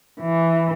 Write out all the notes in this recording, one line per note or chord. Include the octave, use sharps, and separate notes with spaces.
E3